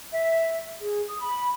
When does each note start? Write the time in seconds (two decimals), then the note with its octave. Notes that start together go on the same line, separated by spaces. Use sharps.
0.11 E5
0.79 G#4
1.08 D#6
1.21 B5